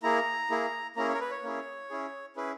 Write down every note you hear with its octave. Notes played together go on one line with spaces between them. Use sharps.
A#3 E4 G#4 A#5
A#3 E4 G#4
A#3 C#4 E4 G#4 A#5
C#5
A#4
B4
C#5
A#3 C#4 E4 G#4
C#4 E4 G#4
C#4 E4 G#4 B4